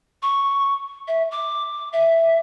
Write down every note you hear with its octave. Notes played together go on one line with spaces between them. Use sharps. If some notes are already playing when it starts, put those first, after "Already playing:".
C#6
E5
D6
E5